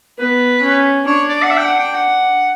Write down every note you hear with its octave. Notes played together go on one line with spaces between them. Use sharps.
B3 B4
C#4
D4 C#5
D5
F#5
E5
G5
F#5
G5
F#5